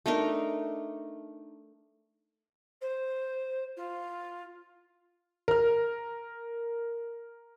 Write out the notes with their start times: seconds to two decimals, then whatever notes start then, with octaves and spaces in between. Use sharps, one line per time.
0.06 A3 D4 D#4 A#4
2.81 C5
3.76 F4
5.48 A#4 F6